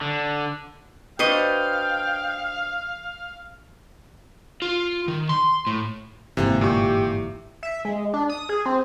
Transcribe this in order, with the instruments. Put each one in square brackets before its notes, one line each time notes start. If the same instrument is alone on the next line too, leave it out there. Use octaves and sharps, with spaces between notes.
[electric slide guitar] D3
[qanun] D4 F#4 B4 [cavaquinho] C5 D#5 C#6 [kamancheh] F5 [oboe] G5
[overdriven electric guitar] F4
D#3
C6
A2
[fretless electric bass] G1 G#2 [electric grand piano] C3 [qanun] E3 A#3 F#5
[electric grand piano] A#2 C#6 [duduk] G4
[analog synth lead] E5
G#3
D4
D#6
G#4
C4